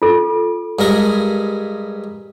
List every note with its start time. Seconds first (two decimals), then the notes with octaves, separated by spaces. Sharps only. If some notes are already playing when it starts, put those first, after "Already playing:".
0.02 F4 A4
0.79 G2 G#3 A#4